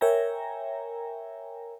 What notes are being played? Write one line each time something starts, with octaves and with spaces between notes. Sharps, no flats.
A#4 C#5 E5 G5 G#5 A#5